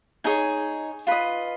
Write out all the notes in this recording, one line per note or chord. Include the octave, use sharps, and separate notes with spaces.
D#4 G#4 C#5 G#5
F4 B4 D#5